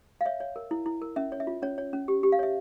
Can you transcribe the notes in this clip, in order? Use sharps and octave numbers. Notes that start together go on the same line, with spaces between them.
F5
C#5 E5
C#5
A#4
E4
E4
A#4
C#4 E5
C#5
E5
F4
C#4 C#5
C#5
C#4
G4
G4
F5
C#5 E5